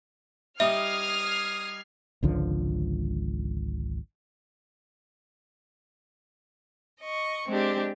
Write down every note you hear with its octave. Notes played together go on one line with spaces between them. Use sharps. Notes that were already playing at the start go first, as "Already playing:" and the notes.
G3 D#4 E5 D#6 F6 G#6 C7
G#1 C#2 D3 F3
D#5 C#6
G#3 C4 D4 G4